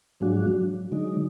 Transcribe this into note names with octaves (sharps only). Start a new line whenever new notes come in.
G#2 F3 F#3 G#3 D4 F#4
F#3
D3 F#3 G#3 D#4